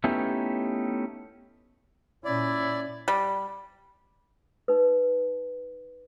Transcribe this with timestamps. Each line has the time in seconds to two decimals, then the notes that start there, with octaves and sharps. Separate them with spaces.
0.04 A3 B3 C#4 D#4 E4 G4
2.25 A#2 C#4 E4 D5
3.08 G3
4.68 D#4 B4